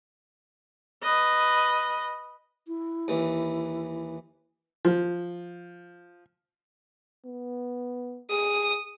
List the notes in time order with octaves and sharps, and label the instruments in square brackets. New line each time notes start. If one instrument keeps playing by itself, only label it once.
[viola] B4 D#5
[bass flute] E4
[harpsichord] D#2 E3
[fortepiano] F3
[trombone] B3
[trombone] G#4 [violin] D#6